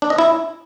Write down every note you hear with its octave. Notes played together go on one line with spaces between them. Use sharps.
D4
D#5
E4